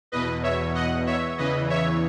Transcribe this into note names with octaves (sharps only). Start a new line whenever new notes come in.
E2 B2 B4 D#5
C#5 E5
D#5 F#5
C#5 E5
E2 C#3 E3 B4 D#5
C#5 E5